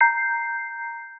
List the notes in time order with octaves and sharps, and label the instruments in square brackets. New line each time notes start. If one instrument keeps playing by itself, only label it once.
[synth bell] A#5 G6 C7